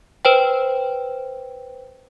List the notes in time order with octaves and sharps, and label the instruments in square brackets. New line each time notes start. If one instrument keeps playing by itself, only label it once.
[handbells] B4 C5 G5